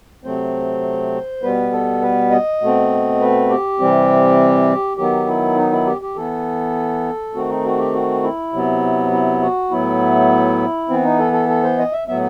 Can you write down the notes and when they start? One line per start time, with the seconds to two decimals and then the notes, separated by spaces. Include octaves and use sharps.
0.24 C3 F#3 A3 C4 C5
1.42 B2 G3 B3 B4
1.72 A4
2.02 B4
2.31 D#5
2.61 B2 A3 C4
3.21 B4
3.50 G4
3.80 C3 E3 G3 C4
4.97 D#3 F#3 B3 G4
5.27 E4
5.56 D#4
5.72 E4
5.86 G4
6.02 G4
6.16 E3 B3 A4
7.34 D#3 A3 C4 F#4
7.49 D#4
7.64 F#4
7.78 G4
7.94 F#4
8.23 E4
8.53 C3 F#3 B3
9.12 E4
9.42 F#4
9.71 A2 F#3 B3 E4
10.89 E3 B3 C4
11.04 D#4
11.19 A4
11.33 A4
11.49 A4
11.64 C5
11.78 D#5
11.92 E5
12.08 A2 F#3 B3 E5